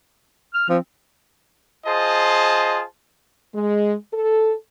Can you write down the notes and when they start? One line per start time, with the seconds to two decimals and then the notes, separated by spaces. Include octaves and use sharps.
0.54 F6
0.69 F3 C4
1.86 F4 G#4 C5 D#5 A5
3.55 G#3
4.14 A4